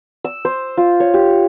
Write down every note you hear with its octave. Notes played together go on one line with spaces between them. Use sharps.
E6
C5
F4
C#5
G4